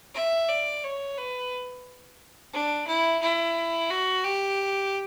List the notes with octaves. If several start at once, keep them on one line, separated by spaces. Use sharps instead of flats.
E5
D5
C#5
B4
D4
E4
E4
F#4
G4